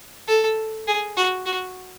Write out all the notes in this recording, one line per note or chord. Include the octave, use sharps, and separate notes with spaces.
A4
G#4
F#4
F#4